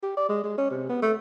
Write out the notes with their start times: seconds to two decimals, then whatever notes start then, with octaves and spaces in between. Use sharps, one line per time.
0.03 G4
0.17 D5
0.29 G#3
0.44 G#3
0.58 C#4
0.70 C3
0.89 B3
1.02 A3